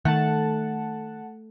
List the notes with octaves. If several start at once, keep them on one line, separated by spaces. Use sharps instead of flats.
D#3 A3 F#5 A5